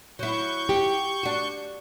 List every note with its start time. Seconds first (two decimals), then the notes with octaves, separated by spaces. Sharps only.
0.19 F#3 E4 C#6 G6
0.69 G4
1.23 D4 F#4